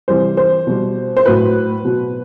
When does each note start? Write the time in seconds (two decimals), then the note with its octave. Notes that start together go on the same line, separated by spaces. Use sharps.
0.08 C3 E3 G3 C5
0.37 C5
0.67 B2 G3
1.17 C5
1.26 A2 F#3 B4
1.84 B2 F#3